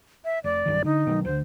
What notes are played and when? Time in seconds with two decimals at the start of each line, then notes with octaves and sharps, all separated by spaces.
0.25 E5
0.44 F1 D5
0.66 B1 G2 D#3
0.85 D3 D#4
1.07 B2 D#3 F#3
1.25 D2 D3 C5